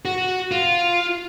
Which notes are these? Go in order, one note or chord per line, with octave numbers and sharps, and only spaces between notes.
F#4
F4